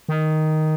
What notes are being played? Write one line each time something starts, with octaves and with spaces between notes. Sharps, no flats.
D#3